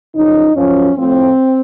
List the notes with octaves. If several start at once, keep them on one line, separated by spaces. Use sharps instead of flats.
F#2 C#3 F3 D#4
F#2 F3 C#4
A2 F3 C4